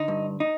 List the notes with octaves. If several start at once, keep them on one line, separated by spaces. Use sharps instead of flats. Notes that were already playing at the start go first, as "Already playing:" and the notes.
Already playing: D3 D#4
G2
D#4